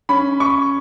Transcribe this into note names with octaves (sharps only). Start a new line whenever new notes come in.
C#4 B5
C#6